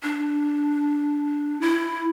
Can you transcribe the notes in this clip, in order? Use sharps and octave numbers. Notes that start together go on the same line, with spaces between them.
D4
E4